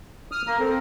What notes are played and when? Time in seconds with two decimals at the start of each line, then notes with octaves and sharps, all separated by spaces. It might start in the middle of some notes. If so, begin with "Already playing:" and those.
0.32 D#6 F6
0.47 A#3 A#5
0.59 C4 A4